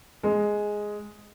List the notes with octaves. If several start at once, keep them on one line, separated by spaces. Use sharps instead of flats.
G#3